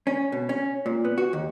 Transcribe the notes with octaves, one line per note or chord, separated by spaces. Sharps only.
C#4
B2
C#4
A#2
B3
F#4
D#2